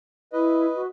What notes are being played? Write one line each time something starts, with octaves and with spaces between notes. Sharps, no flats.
E4 B4 D#5
F#4